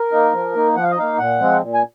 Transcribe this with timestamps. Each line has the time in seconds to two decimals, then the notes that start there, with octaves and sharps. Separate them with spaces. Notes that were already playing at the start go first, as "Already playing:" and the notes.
Already playing: A#4
0.12 A#3 D#4
0.33 F3
0.55 A#3 D#4
0.76 F3 F#5
0.83 F5
0.91 D#5
0.97 A#3 D#4 F5
1.19 A#2 F#5
1.40 F3 G#3 C4
1.62 A#2
1.74 G#5